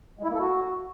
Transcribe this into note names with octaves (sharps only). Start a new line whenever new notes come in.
G#3
E4
A#3
A4
F#4